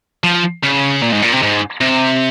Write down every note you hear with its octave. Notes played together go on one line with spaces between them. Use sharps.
F3
C#3
A#2
G#2
A#2
C3
G#2
C3